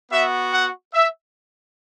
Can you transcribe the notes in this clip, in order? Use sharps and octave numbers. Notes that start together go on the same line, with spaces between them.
B3 F#4 E5
F#5
E5